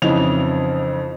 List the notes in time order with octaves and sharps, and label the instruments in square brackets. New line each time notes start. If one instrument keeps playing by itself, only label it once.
[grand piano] F2 C#3 E3 D#4 F7